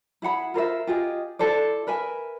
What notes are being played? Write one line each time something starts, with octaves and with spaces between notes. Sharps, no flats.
E4 G#4 F#5 B5
F4 A#4 C5 E5
F4 G4 G#4 D#5
E4 A4 C5 D5
A#4 B4 E5 G#5